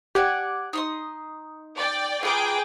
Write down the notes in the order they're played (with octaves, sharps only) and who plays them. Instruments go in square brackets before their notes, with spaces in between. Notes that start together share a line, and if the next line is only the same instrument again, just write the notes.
[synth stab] G4 [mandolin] D5 F#5 G#5
[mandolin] D#4 C6 D#6
[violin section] D5 G5
[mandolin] F4 B4 A#5 [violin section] G#4 G5 D6